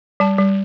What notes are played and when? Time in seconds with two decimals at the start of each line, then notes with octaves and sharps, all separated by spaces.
0.20 G3 A5
0.38 G3